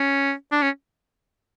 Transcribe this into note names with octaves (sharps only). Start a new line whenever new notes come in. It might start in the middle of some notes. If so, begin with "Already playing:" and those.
Already playing: C#4
D4
C#4